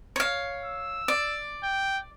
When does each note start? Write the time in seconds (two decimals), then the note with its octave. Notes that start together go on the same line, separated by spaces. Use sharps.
0.16 C#5 F5
0.65 E6
1.08 D5
1.63 G5